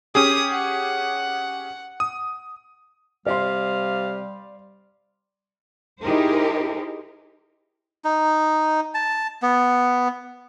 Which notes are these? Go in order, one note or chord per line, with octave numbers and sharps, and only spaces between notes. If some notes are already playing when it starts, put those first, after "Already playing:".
C#4 G4 G#4 D#6
F#5
D#6
C3 G3 D5 F5 C6
D#4 E4 G4 G#4 A#4 C5
D#4
A5
B3